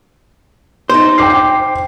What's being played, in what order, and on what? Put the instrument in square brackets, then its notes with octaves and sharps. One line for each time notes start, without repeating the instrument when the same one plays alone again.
[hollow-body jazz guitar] D#4 C5
[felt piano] G5 D6 C7